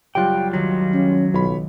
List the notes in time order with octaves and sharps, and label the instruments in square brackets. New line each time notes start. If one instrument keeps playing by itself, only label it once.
[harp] F#1 F#3 F#6 [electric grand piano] G3 F4 G4 [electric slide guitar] G5
[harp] C#2 D#3 [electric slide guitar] F#3
[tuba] C#4
[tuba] B1 [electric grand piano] F4 C#5 B5